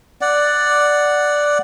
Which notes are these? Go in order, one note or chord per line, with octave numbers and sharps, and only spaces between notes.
D5 F#5